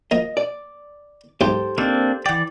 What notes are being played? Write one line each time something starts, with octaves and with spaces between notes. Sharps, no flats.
F3 A#3 D#5
D5
B1 G#2 E3 G4 A4 C5
A#3 C4 D4 D#4
E3 D5 F#5 G5